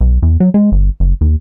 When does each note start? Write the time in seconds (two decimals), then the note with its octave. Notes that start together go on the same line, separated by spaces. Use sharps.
0.01 B1
0.22 E2
0.40 F#3
0.54 G#3
0.72 G1
1.00 F#1
1.21 D#2